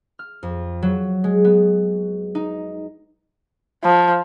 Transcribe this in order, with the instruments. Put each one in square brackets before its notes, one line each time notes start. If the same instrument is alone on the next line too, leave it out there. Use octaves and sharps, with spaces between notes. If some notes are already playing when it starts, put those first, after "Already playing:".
[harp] F6
F2
F#3
G#3
B3
D#4
[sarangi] F3